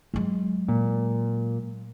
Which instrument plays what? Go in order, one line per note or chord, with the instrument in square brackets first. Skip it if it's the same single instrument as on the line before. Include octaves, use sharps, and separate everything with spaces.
[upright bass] F#3 G#3
[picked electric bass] A#2